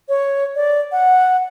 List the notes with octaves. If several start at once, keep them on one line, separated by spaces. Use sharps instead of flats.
C#5
D5
F#5